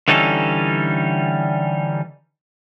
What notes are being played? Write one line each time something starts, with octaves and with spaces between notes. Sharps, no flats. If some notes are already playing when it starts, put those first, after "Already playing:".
D3 E3 G3 C#4 D#4 A4